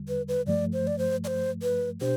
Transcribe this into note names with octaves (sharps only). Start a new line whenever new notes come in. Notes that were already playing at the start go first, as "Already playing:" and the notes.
Already playing: E2 D3 G3
B4
B4
G2 F3 A3 D5
C5
D5
C5
D5
C5
B4
B2 D4 G4 C5